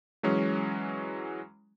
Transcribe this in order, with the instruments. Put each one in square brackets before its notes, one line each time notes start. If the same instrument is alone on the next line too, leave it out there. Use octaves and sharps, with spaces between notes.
[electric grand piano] E3 F#3 G#3 C#4